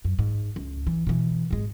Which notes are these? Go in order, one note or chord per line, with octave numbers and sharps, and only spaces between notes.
F#2
G#2
C#2
E3
B2 E3
G#1 G#3